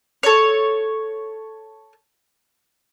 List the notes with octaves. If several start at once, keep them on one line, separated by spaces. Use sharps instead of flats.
A4 C#5